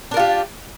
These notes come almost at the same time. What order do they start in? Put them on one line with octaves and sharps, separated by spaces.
D4 A#4 F4 G4